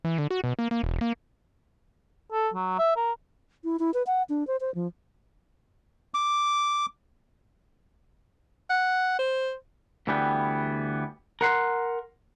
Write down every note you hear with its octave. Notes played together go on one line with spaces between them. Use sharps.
E3
D3
F#4
B2
A#3
A#3
E1
A#3
A4
F#3
E5
A#4
E4
E4
B4
F#5
D4
C5
C5
F3
D6
F#5
C5
D2 E3 G3 B3 G5
A#4 F#5 C6